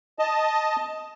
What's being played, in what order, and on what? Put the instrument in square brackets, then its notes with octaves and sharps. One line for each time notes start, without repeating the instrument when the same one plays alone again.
[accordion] D#5 A5